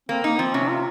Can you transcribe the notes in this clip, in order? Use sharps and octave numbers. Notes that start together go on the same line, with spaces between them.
A#3 C4
A#3 D#4
F3 C4
C3 C#4
F4